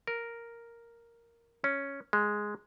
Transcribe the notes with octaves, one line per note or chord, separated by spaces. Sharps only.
A#4
C#4
G#3